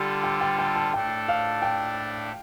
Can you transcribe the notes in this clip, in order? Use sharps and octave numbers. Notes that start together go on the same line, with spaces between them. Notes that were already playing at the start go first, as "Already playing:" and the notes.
Already playing: D3 G3 F4 G4 A4
G5
G5
G5
A5
A2 A3 D4 A4 G5
F5
G5